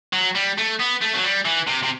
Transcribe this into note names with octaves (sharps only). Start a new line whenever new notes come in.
F#3
G3
A3
B3
A3
F#3
G3
E3
C3
C3